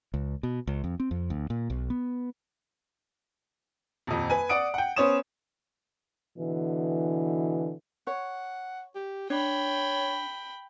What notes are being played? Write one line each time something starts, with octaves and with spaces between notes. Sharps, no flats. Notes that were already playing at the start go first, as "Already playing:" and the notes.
C#2
B2
C#2
F2
C4
F2
D2
A#2
B1
B3
D#1 F2
B4 G#5
D5 F#5 D#6 D7
F#5 G5
B3 C#4 C5 C#5 D#6 E7
B2 D3 E3
C#5 F#5
G4
D4 C#5 G5 B5